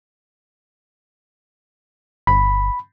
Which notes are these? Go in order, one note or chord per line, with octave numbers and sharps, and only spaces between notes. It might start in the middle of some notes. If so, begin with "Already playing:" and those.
G1 B5